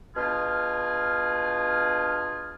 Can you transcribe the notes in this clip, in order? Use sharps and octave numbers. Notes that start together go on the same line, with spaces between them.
B2 D4 F4 G#4 F6